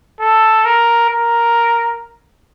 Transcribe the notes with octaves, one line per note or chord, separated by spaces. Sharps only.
A4
A#4
A#4